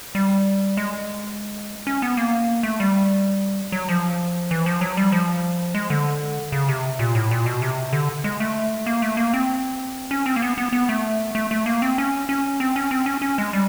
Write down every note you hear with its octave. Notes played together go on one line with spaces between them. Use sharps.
G3
G#3
C#4
B3
A#3
A3
G3
F#3
F3
E3
F3
F#3
G3
F3
G#3
D3
C#3
C3
A#2
A2
A#2
B2
C3
D3
G#3
A3
A#3
A3
A#3
C4
C#4
C4
A#3
B3
B3
B3
A3
A3
A3
A#3
C4
C#4
C#4
C4
C#4
C4
C#4
C#4
G#3
G3